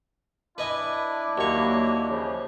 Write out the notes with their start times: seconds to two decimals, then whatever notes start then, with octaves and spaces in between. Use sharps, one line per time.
0.58 D4 E4 B4 D5 D#5 G#5
1.38 D#2 F#3 A#3 C#5
2.11 C#3 F3